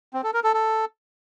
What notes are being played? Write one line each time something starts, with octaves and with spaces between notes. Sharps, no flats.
C4
A4
A#4
A4
A4